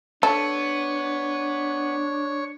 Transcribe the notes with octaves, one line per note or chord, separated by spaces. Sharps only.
B3 D4 A4 C#5